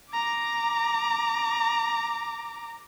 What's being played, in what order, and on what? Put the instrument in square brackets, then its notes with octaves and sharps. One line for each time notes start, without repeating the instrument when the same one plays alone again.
[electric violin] A#5 D6